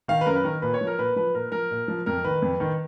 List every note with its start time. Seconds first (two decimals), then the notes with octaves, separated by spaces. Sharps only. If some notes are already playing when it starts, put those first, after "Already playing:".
0.08 D#3 F5
0.21 B4
0.26 F#2 A#4
0.35 B4
0.44 D#3 A#4
0.62 A#2 B4
0.74 C#5
0.81 F3
0.87 A#4
0.98 A#2 B4
1.16 F3 B4
1.35 A#2 A#4
1.52 F3 A#4
1.71 A#2
1.88 F3
2.06 F2 A#4
2.24 D#3 B4
2.42 F2
2.60 D#3